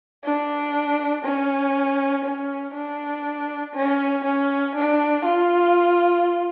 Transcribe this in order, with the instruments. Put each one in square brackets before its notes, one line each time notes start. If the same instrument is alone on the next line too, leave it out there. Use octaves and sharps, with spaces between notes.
[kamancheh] D4
C#4
C#4
D4
C#4
C#4
D4
F4